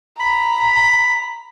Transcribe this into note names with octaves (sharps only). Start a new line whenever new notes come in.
A#5 B5